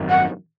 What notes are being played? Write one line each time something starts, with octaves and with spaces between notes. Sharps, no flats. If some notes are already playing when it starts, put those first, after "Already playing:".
Already playing: G#1 F#2 D#3
F#5